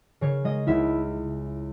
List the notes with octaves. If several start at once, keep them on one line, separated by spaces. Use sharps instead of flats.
C#3 C#5
G#3 D#5
C#2 E4 E5